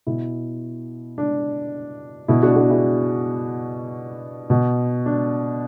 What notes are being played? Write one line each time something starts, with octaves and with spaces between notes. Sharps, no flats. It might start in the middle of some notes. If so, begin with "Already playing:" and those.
B2 E4
D4
B2 E4
D4 F#4
D4 F#4
E4 G#4
B2
D4